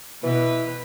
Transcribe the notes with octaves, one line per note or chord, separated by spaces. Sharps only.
B2 E3 B4